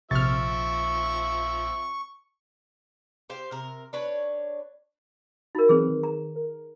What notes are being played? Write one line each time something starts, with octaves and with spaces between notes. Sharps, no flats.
A#1 C3 F3 C4 E5 C#6 F6 A6
G4 C5 F5
C3 A#4
D4 B4 C#5
D#4 F#4 A#4 B5
E3 F#3 C4 G#4 B4 C5
D#3
A#5
A#4